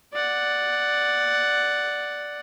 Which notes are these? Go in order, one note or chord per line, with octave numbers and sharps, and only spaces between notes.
D5 F#5